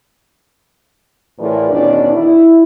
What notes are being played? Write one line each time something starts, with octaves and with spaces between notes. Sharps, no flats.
A2 E3 F4 G#4 A#4 D5
E2 B2 D#3 C#4 D4 D5
E4